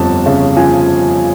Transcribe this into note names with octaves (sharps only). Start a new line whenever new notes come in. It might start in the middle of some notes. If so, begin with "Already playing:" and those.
Already playing: G1 F2 A5
C#3
F3 G#5